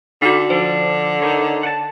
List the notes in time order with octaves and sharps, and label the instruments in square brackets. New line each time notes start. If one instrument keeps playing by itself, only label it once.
[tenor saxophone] D3 [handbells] D#4 F#4
[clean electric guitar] F3 D4 [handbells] C5
[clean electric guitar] D#4 A#4 C#5
F#5 A5